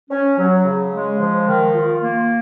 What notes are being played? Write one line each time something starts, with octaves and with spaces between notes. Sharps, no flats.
C#4
F#3
C#3
G#3
F3
D#3
F4
A#3